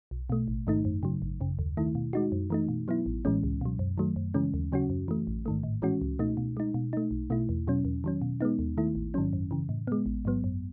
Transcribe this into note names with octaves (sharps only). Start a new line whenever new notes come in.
B1
B2 A3
A1
G#2 D#3 A3 D#4
F#2
C#3 F#3
G#1
F#2 C#3
D#2
D#3 A3 E4
B2
G#3 D#4 F#4
F#2
E3 A3 D#4
B2
F#3 B3 E4
A1
A2 E3 G#3 C#4
C#2
B2 F#3
F#2
D#3 F#3 A3
F#2
C#3 E3 G#3 C#4
D#2
C#3 F#3 C#4 F#4
F#2
E3 A3
A1
G#2 D#3 A3
A2
E3 G#3 C#4 F#4
C#2
B2 A3 D#4
B2
G#3 D#4
B2
A3 D#4
B1
B2 A3 E4
E2
B2 F#3 C#4
E2
D#3 F#3 C#4
B2
G#3 B3 D#4
D#2
D#3 A3 E4
A1
G#2 D#3 F#3 C#4
F#2
C#3 E3
A2
G#3 B3
A1
G#2 F#3 B3
F#2